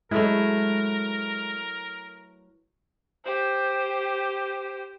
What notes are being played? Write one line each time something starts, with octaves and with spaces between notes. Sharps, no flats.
F#3 G#3 A3 E4 A#4 B4
G4 C5